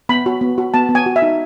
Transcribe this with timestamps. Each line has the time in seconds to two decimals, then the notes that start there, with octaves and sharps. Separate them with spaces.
0.09 B3 B5
0.26 F#4
0.41 B3
0.58 F#4
0.74 B3 A5
0.89 B3
0.95 G#5
1.06 F#4
1.16 E5
1.22 D#4